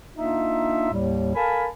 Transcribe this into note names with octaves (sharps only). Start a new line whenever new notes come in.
A#3 D4 D#4 F4 E5
D#2 A2 G3
A4 A#4 F5 G#5 A5 B5